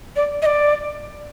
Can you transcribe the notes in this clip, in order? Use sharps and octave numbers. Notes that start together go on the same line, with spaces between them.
D5
D#5
D5